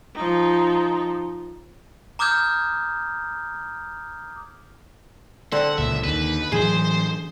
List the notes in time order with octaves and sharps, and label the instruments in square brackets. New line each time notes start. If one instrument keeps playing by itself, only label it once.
[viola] F3 D#4
[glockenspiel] A#5 D6 D#6 F6 G6 G#6
[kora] D3 C4 [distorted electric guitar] F#5
[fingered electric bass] C#2 A#2 [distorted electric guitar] E5
[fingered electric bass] D#2 D#3 [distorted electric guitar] B4
[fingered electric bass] A2 E3 F#3 [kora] G#4 [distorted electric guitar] C5